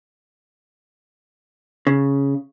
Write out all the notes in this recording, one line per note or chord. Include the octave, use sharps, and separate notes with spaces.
C#3